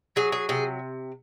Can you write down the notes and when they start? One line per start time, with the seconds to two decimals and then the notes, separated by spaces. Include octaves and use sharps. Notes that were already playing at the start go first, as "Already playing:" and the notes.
0.16 F#3 G#4
0.32 G#4
0.49 C3 G#4